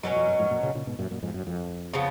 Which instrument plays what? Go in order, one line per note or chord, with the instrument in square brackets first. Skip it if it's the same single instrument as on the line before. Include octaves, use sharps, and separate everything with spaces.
[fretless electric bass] F#2 [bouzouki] B2 F#3 C#4
[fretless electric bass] F2
F#2
F2 G#2
F#2 A#2
A#2 C#3
A#2 C#3
G#2 B2
F#2 A#2
F#2 A#2
F2 G#2
F#2
F2
[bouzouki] C#3 F3 B3